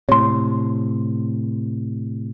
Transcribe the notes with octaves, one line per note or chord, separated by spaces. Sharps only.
A2 C3 C#5 C6